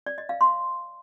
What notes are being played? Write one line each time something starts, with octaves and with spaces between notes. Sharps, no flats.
D5
D#5
F5
C6